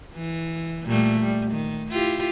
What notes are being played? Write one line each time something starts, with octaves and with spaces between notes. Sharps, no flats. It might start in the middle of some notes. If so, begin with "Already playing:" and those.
E3
A#2 G3 A3
G3
D#3
E4 F4 G4